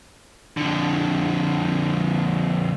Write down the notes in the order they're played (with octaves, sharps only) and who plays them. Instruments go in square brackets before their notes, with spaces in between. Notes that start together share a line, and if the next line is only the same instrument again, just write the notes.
[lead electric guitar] F2 D3